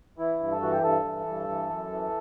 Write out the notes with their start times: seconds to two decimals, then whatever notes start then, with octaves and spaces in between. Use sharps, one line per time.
0.18 E3 E4
0.40 G2
0.51 A4
0.61 E3 F#4
0.72 G4
0.83 G2 A4
1.04 E3
1.27 G2
1.49 E3
1.69 F#2
1.91 E3